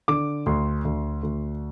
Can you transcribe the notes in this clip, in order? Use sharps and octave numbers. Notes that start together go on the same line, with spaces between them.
D3 D6
D2 C6
D2
D2